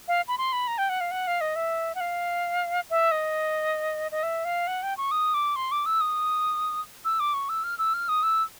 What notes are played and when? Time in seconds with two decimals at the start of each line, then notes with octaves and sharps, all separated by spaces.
0.08 F5
0.28 B5
0.38 C6
0.53 B5
0.68 A#5
0.78 G5
0.89 F#5
1.01 F5
1.11 F#5
1.27 F5
1.41 D#5
1.56 E5
1.95 F#5
2.01 F5
2.90 E5
3.11 D#5
4.12 D#5
4.23 E5
4.45 F5
4.67 F#5
4.83 G5
4.97 C#6
5.11 D#6
5.34 D6
5.56 C6
5.72 D6
5.86 E6
6.01 D#6
7.05 E6
7.20 D6
7.34 C#6
7.49 E6
7.64 F6
7.78 E6
7.94 F6
8.09 D#6
8.23 E6